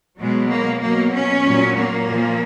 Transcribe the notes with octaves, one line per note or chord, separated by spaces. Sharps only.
B2 F#3 G#3
A#3
B2 F#3 A#3
C#4
A#2 F#3
A#3
A#2 F3